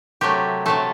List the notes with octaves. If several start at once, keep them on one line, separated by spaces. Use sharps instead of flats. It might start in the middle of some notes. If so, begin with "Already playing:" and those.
C3 F#3 A3 G4
C3 F#3 A3 A4